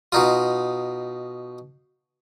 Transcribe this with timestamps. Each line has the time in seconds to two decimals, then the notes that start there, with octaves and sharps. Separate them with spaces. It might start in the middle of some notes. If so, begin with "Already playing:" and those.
0.12 B2 D#4 F4